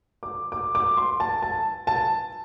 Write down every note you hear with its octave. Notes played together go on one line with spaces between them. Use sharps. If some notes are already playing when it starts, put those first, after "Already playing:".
D6
D6
D6
C6
A5
A5
A5